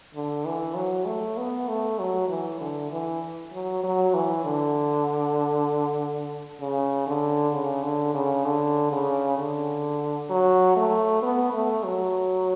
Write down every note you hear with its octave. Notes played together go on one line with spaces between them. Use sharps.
D3
E3
F#3
A3
B3
A3
F#3
E3
D3
E3
F#3
F#3
E3
D3
C#3
D3
C#3
D3
C#3
D3
C#3
D3
F#3
A3
B3
A3
F#3